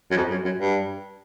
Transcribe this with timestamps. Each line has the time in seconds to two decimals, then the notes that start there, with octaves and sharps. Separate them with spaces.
0.11 F#2
0.17 F2
0.31 F#2
0.45 F#2
0.59 G2